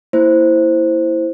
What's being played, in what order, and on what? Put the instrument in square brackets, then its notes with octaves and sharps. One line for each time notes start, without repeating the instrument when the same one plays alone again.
[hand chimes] A#3 E4 C5